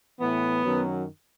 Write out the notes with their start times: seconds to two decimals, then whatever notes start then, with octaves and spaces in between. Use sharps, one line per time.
0.19 A2 E3 B3
0.63 F#2 D#3 F#3